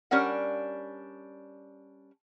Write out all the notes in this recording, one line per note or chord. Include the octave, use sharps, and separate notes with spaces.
G3 C#4 D4 A#4 F#5